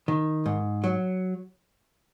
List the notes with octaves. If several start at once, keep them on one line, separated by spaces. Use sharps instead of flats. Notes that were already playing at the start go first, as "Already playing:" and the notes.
D#3
G#2
F#3